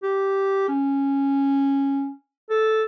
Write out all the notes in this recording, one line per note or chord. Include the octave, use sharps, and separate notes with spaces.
G4
C#4
A4